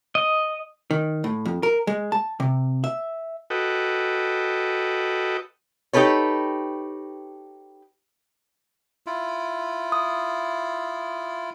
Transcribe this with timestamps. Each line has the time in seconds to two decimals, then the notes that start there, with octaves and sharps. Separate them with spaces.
0.15 D#5
0.91 D#3
1.24 A2
1.45 F2
1.63 A#4
1.87 G#3
2.12 A5
2.40 C3
2.84 E5
3.50 F#4 A4 B4 D#5 G5
5.93 D#4 G4 A4 B4 C#5
9.06 E4 F4
9.92 D#6